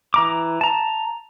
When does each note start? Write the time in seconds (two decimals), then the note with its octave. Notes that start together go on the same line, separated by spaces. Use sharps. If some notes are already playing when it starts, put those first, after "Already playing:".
0.14 E3 A#5 D6
0.61 A5 A#5